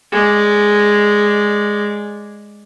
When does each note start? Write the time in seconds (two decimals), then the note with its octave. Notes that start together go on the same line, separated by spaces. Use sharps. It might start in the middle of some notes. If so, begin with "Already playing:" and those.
0.12 G#3 D5